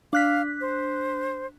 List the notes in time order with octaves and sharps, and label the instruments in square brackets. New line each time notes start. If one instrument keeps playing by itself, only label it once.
[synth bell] D4 F#6 B6 [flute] F5
[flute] C5